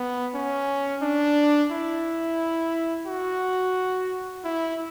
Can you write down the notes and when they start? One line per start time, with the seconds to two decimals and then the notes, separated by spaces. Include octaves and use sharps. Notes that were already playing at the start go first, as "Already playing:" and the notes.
Already playing: B3
0.34 C#4
1.02 D4
1.71 E4
3.07 F#4
4.44 E4